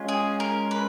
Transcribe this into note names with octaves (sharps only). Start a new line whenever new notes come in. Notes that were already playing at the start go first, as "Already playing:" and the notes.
Already playing: G#3 C#4 F4
G#4
A#4
B4